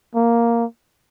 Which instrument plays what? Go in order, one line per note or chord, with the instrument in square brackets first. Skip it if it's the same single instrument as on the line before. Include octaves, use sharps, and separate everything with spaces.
[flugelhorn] A#3